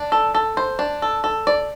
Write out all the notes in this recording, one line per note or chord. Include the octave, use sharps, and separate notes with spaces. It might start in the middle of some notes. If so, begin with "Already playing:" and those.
Already playing: D4
A4
A4
C5
D4
A4
A4
D5